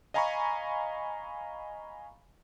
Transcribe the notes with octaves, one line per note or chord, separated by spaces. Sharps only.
D#5 F5 G#5 A#5 B5 C#6